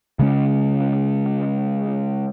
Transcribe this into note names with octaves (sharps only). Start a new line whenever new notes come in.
C#3 G#3 C#4